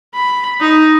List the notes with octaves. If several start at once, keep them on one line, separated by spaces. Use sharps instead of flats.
B5
D#4